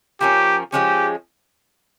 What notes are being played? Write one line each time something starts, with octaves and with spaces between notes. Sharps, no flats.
F3 A#3 C#4 G4
F3 G#3 C#4 G4